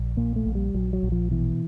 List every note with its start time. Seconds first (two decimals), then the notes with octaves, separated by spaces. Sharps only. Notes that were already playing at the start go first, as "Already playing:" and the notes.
Already playing: A#1
0.17 A#2 A#3
0.36 A3
0.46 A#1
0.55 G3
0.74 A#1 F#3
0.93 F#3
1.03 A#1
1.12 F3
1.31 B2 E3